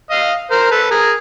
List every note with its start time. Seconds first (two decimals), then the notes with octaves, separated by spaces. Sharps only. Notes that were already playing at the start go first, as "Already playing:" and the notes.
0.11 D#5 F5
0.51 A#4 C5
0.71 A4 B4
0.90 G#4 A#4